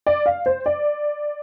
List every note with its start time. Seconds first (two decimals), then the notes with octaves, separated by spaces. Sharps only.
0.07 D5
0.26 F5
0.46 C5
0.66 D5